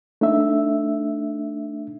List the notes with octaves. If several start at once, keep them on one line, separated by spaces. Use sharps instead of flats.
A3 D4 D#4 E5